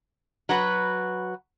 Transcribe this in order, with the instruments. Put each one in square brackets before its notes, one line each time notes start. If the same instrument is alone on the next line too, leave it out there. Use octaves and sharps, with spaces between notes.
[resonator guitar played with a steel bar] F#3 F#4 B4